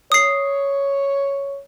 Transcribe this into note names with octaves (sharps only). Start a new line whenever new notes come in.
C#5 D#6 C7